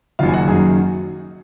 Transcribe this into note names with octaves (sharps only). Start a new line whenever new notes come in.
F#1 F#2 D#3 F#3 F4 F5
G#5
F#4 F#5
F#1 F#2 D#3 F#3 G#4 G#5